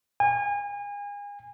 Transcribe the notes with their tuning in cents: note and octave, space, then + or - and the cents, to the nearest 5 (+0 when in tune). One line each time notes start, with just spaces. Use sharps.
G#5 -35